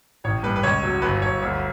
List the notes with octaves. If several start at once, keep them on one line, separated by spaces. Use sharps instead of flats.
A1 C#5
G2 B4
B4
C#2 C#5
F#3
G1 B4
G1 C#5
D2